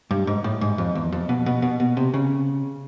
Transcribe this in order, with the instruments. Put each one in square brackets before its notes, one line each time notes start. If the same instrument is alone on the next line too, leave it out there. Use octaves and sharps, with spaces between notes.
[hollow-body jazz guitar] G2
G#2
A2
G#2
F2
E2
F2
B2
B2
B2
B2
C3
C#3